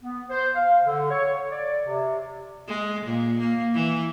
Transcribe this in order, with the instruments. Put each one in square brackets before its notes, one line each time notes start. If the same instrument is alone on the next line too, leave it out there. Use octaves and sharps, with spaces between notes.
[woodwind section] B3
C5
F5
D3
C#5
D5
C3
[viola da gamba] G#3
A#2
A#3
E3